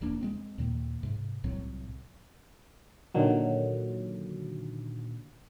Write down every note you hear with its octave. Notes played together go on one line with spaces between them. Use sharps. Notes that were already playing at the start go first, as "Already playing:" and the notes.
E1 E2 A#3 D4
G#3 B3 C4
D#2 A#2 D#3 A#3
G#2 C3
C2 A2 F#3 C4
A#2 D3 D#3 F#3